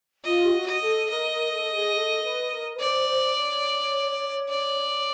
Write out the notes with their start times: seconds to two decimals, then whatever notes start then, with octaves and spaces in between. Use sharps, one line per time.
0.25 F4 D#5
0.44 G4
0.53 F#4
0.67 D#5
0.82 A4
1.09 A#4 D#5
1.31 A#4
1.53 A4
1.73 G#4
1.95 A4
2.24 B4
2.52 A#4
2.75 B4
2.80 C5 D5
3.08 C5
3.36 C#5
4.50 D5